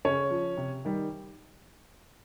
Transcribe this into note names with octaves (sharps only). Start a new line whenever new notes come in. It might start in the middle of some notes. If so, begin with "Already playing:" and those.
C#3 C#4 C#5
F3
C3
D#3 G3